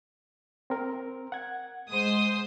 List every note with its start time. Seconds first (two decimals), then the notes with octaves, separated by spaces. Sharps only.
0.70 C4 A#4
1.32 F#5 G#6
1.89 G#3 C5 D#6